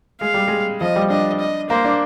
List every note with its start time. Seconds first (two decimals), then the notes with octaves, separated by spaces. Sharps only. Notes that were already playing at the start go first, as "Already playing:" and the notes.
0.21 G#3 F5
0.34 G3
0.48 G#3
0.81 F3 D#5
0.96 G3
1.10 D4 D#5
1.40 D#5
1.70 A#3 C5
1.85 D4